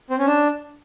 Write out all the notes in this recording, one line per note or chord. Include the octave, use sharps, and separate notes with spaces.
C4
C#4
D4